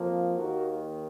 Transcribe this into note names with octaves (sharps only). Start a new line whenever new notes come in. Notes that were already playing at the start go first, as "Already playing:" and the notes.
Already playing: F2 F3 A#3
D#2 D#3 A#3 F#4 A#4